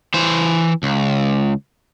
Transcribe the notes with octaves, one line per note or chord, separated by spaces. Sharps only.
E3 C5
C#2